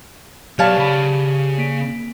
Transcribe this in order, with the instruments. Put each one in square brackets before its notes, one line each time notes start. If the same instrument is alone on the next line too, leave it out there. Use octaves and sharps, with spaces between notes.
[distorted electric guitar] F#3 B4 [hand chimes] G4 D5 [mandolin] C#5 F5 A5
[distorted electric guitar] C#3 B5
[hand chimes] A#3 B6 D7